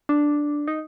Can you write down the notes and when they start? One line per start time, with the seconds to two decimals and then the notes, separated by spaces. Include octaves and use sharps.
0.09 D4
0.68 D#4